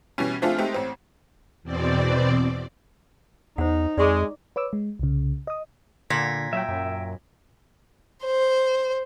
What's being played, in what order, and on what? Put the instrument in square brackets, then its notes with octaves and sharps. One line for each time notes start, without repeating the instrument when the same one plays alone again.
[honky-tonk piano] B2 E3 G3 C#4
F3 A3 C4 D4 F4 G#4
G#3 A3 C4 D#4 G4
A1 C4
[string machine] E2 B2 C4 D5
[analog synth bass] E2 [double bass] D#4 [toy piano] C5 F#5
[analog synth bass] F2 [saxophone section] G#3 [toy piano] D5 C#6 D6
[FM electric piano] B4 C#5 D6 E6
G#3
C2 C#3
D#5 D#6
[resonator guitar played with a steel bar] A#2 [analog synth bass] D3 [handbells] G#6 A#6 B6
[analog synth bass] F#3 [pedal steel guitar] E5 G5
[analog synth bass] F#2
[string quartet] C5